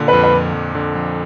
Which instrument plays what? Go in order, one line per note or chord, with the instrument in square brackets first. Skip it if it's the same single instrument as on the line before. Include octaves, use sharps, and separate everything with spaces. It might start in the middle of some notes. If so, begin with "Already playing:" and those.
Already playing: [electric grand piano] A#2 D3
[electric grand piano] F2 [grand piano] B4
[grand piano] B4
[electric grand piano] F2
F2
D3
F2